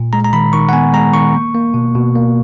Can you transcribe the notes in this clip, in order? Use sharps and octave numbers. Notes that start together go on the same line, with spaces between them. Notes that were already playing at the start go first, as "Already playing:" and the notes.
Already playing: A#2
G#3 A#5
A#5
D#3 B5
D#3 C#6
F#5
B3 G#5
G#3 A#5
D#3 C#6
A#3
A#3
B2
B2
A#3